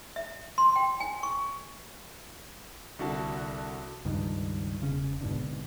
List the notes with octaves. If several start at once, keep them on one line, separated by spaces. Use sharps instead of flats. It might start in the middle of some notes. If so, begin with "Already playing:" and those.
E5
C6
G5
G#5
C#6
C2 D3 F#4 A5
C#2 G2 D#3
E1 C#3 C#4
G#1 G#2 B2 D3